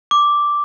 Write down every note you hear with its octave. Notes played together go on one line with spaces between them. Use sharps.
D6